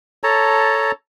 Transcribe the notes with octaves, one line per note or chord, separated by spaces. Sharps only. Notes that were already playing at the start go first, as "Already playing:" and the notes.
A4 C#5 A5 A#5